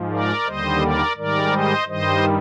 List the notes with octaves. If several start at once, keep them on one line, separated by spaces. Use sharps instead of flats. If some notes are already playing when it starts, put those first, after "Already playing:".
Already playing: G#2 F3
A#4 D5
D#2 D3 G3 C5 D#5
A#4 D5
G#2 D#3 G3 A#4 D5
C5 D#5
G2 D#3 G3 C5 D#5